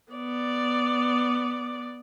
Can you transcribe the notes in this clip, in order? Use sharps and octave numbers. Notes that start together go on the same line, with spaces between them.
B3 D5